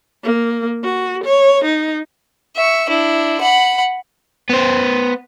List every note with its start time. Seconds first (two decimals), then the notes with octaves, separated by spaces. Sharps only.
0.24 A#3
0.84 F#4
1.24 C#5
1.64 D#4
2.56 E5 C#6
2.90 D4 E4
3.41 F#5 B5
4.49 B3 C5